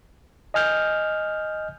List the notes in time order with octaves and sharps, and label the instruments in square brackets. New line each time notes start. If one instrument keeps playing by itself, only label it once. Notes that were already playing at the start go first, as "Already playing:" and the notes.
[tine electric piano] D#5 G#5 F6 G6